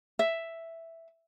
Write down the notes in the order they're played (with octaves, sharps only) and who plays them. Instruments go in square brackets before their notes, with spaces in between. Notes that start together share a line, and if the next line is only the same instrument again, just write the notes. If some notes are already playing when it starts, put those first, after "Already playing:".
[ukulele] E5